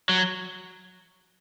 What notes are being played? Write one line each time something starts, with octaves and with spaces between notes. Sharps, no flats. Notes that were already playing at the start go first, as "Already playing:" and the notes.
F#3